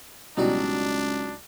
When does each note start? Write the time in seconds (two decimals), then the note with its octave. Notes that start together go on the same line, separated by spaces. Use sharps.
0.37 C#2 B2 E3 F#3 G3 D4 D#4 F#4